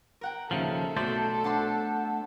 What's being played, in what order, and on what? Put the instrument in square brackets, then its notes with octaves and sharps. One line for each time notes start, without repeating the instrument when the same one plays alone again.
[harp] A#4 F#5 G5
[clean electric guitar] D#2 C#3 F3 [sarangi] A4 [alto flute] E5 [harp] C7 C#7
[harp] B1 B6 [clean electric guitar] A3 C5 D5 [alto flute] F#4
[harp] D4 A5 C6 [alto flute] F#5